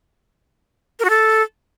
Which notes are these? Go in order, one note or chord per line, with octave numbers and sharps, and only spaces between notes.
A#4
F#4
A4